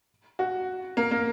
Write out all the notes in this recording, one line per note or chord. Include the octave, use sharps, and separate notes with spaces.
F#4
A#3
A#3